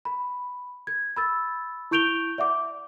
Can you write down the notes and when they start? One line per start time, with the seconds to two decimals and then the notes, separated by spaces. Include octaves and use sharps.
0.05 B5
0.87 G#6
1.16 B5 E6 A6
1.91 E4 C#6 G6 D7 F7 G7
2.38 D5 E5 F#5 D6